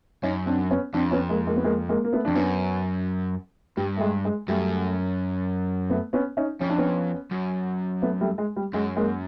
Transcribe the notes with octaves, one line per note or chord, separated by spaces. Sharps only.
F#2 C#4 D#4
C4 D4
B3 C#4
F2 C4 D4
B3 C#4
G#3 A#3
G#3 A#3
B3
G#3 A#3
G#3 A#3
A#3
A3 B3
F2 D4
F#2 B3 C#4
G2 G3
A3
G#3
G#3
F#2 G3 A3
A3 B3
B3 C#4
C#4 D#4
F2 C#4
D4
B3 C#4
F#2
A3 B3
G3 A3
G#3
G3
F#2 G#3
G#3 A#3